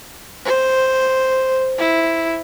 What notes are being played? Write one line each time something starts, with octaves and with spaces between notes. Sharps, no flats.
C5
E4